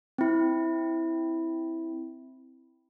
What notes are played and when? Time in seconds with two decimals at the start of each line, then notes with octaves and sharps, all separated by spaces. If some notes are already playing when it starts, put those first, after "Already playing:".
0.18 C4 E4